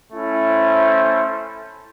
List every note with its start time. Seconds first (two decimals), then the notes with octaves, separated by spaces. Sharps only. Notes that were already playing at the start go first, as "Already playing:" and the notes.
0.12 A3 C#4 E4
0.48 C5